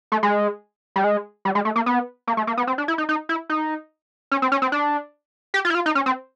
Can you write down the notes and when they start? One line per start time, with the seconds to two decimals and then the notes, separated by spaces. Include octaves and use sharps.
0.12 A3
0.23 G#3
0.96 G3
1.04 G#3
1.45 G3
1.55 G#3
1.65 A3
1.76 A#3
1.86 B3
2.27 A#3
2.37 A3
2.47 A#3
2.57 B3
2.67 C4
2.78 D4
2.88 E4
2.98 D#4
3.09 D#4
3.29 E4
3.49 D#4
4.31 C#4
4.42 C4
4.52 C#4
4.62 C4
4.72 D4
5.54 G4
5.65 F4
5.70 E4
5.75 F4
5.86 D#4
5.95 C#4
6.06 C4